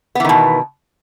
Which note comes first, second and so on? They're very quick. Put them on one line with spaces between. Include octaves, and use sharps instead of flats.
B3 E3 D#3 B2